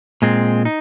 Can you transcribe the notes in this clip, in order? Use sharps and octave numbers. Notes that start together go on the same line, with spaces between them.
A#2 G#3 C4
D#4